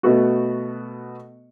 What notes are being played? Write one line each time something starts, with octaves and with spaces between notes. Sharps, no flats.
B2 A3 B3 F#4